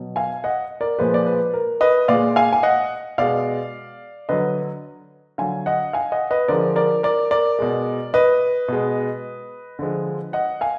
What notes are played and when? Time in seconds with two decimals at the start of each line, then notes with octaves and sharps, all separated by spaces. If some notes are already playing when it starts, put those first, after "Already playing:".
Already playing: B2 F#3
0.16 F5 G#5
0.44 D#5 F#5
0.81 A#4 D5
0.98 A#2 F3 G#3 B4
1.14 D5
1.26 B4
1.54 A#4
1.81 B4 D#5
2.08 A#2 G#3 D5 F5
2.36 F5 G#5
2.53 G#5
2.63 D#5 F#5
3.18 B2 G#3 D5 F5
4.29 D3 F#3 B4 D#5
5.38 D3 F#3 F5 G#5
5.66 D#5 F#5
5.93 F5 G#5
6.12 D#5 F#5
6.30 B4 D#5
6.48 D3 F3 G#3 A#4 D5
6.76 A#4 D5
7.03 A#4 D5
7.31 A#4 D5
7.59 B2 G#3
8.14 B4 D#5
8.68 B2 G#3
9.79 D3 F3 G#3
10.33 D#5 F#5
10.61 F5 G#5